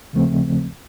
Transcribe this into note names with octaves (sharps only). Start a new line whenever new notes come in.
D#2 C#3 F3 A3 C4